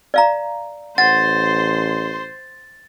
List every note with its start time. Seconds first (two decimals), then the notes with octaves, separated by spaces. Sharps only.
0.14 D5 F5 A#5
0.98 A1 C5 F#5 C6 A6